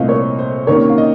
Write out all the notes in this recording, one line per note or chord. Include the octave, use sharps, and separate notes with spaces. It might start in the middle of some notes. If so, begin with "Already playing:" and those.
Already playing: C2 A#2 A3 C4 D#5 F5
C#5
C5
C3 D#3 A#3 C#4 C#5
F5
D#5